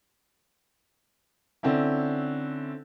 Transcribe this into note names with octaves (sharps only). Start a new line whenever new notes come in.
D3 C4 C#4 E4